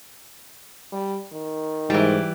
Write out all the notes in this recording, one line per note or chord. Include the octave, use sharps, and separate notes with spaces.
G3
D#3
G#2 E3 G3